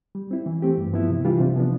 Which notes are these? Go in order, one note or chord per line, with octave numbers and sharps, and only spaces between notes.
G3
C4 E4
E3
A3 C4 G4
G2
F3 B3 E4
C3
E3 G3 D4 F4
C3
F3 B3 D4